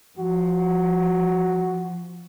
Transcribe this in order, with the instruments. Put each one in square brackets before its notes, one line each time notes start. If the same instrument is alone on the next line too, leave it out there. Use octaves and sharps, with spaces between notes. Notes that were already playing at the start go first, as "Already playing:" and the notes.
[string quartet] F3 [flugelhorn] F#4